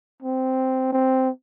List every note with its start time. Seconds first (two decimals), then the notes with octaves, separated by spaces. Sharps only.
0.22 C4
0.92 C4